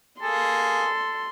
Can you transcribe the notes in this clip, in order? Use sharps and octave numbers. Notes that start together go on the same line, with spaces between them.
A#3 G#4 A4 C6